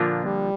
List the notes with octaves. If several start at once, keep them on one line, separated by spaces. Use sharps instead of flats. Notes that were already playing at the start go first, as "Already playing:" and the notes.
Already playing: A#2 D3 F3 A#3 D4 F4
G3